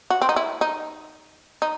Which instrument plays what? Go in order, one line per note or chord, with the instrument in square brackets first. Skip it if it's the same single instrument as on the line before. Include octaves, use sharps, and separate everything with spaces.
[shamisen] F#4
C4
D#4
E4
D#4
D#4